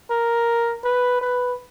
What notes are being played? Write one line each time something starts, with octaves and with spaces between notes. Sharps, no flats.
A#4
B4
B4